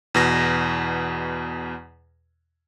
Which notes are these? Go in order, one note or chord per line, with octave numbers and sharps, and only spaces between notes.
E2 B2 A#6